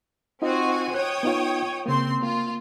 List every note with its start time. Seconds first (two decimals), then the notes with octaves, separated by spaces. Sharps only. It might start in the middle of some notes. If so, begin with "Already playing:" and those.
0.42 C4 D#4 F4 F#4 D#5 G#5
0.94 C#5 G5 D#6 F#6
1.23 B3 D#4 F4
1.86 C#3 A#3 C4 C6
2.22 A#3 F4